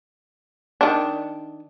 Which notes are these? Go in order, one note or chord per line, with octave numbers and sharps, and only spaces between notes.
D#3 D4